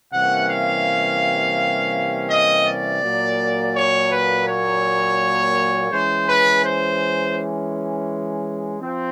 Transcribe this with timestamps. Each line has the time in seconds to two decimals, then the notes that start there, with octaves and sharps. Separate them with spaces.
0.12 C3 E3 G3 A#3 C#4 F#5
0.49 F5
2.29 D#5
2.66 D5
3.02 A#2 F#3 A#3
3.75 C#5
4.10 B4
4.46 C#5
5.91 E3 G#3 C#4 C5
6.27 B4
6.63 C5
8.81 F3 C4